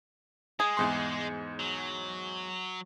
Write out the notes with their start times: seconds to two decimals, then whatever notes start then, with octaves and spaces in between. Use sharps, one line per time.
0.60 G#3 G#4
0.77 E2 G#2 C6
1.59 F#3